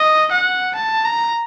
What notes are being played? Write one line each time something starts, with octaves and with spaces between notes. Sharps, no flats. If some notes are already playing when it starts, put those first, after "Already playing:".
Already playing: D#5
F#5
A5
A#5